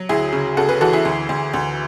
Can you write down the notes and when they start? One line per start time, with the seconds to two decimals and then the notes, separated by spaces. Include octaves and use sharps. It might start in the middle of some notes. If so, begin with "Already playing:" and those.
Already playing: F#3
0.09 D2 E4 G#4
0.33 C#3
0.57 C#3 F#4 A4
0.69 G#4 B4
0.81 E3 F#4 A4
0.93 E4 G#4
1.05 D2
1.29 D2
1.54 D2